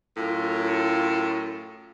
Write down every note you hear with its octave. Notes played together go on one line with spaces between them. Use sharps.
F#2 A2 F4